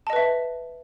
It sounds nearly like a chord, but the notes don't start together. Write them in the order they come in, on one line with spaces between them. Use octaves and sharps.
A5 D#5 B4 E5